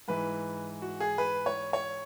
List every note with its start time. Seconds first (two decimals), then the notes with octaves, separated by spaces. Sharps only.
0.08 G#2 E3 B4
0.82 F#4
1.00 G#4
1.18 B4
1.46 C#5
1.73 C#5